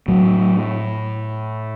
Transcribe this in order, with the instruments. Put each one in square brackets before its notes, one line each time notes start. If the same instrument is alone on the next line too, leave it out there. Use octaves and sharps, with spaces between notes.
[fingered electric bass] A2 F#3